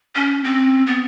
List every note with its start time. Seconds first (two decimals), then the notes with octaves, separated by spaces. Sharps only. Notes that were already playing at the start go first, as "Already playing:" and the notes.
0.16 C#4
0.44 C4
0.87 B3